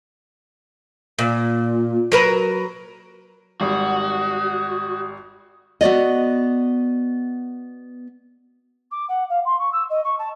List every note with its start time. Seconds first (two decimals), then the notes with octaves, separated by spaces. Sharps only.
1.19 A#2
2.12 F#3 A#4 B4
3.61 G#1 G3 F#4 D#6
5.81 B3 F#4 D5 D#5
8.91 D6
9.09 F#5
9.30 F5
9.45 C6
9.58 C#6
9.72 E6
9.90 D#5
10.04 C#6
10.18 A5